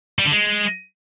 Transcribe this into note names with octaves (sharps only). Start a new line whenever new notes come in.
G3
D3
G#3